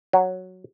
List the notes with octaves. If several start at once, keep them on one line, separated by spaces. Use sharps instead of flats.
F#3